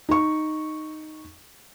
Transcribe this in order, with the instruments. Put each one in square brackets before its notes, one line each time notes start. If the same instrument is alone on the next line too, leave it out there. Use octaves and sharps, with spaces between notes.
[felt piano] D#4 C#6